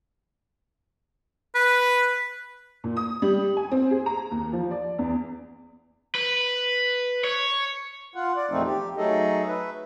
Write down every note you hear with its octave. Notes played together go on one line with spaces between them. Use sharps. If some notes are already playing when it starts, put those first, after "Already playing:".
B4
A#2
D#6
G3
G#5
C4
G#4
A#5
D#2
F3
D5
E2
B4
C#5
F4 F#5
D5
E2 A#2 F3 A3 C4 D#4
G4
F#3 A3 D#4 G#4 A4 D#5
B4 E5